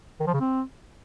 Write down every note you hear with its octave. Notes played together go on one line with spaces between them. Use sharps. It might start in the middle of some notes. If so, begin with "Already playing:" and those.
D#3
F3
C#3
C4